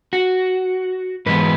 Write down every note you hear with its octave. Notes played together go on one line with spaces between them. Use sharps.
F#4
G#2 E3 G#3 B3 B4